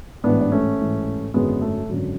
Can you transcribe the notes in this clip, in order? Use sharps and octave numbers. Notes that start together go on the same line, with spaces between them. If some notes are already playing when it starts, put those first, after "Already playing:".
A1 G#2 E3 B3 D4
D4
A3 C#4
A1 G#2 E3
G#1 F#2 D3 F#3 G#3 B3
A3
G#1 F#2 D3 F#3